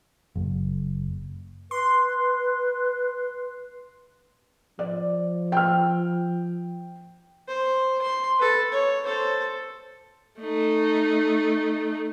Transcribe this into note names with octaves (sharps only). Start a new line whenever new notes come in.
F#1
B4 C6
F3 D5
G5 F6
C5
C6
A4 B4
C#5
A4 C5
A3 D#4